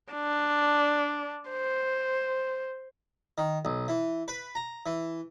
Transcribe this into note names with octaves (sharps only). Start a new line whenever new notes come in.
D4
C5
D#3
B1
E3
B4
A#5
E3